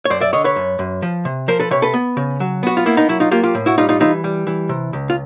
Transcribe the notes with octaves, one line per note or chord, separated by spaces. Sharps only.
C#5
F#2 C5 D5
D5 E5
D3 C#5 D#5
B4 C#5
F#2
F#2
F3
C3
F3 A#4 C5
A4 B4
C3 B4 C#5
A4 B4
B3
C#3
F#3
B3 F#4
F4
A#3 E4
D#4
F#3 E4
D#4 F4
A#3 F4 G4
F4 G4
A2
E4 F#4
G3 D#4 F4
D#4 F4
E3 D#4 F4
G3
E3
C3
C#2
F4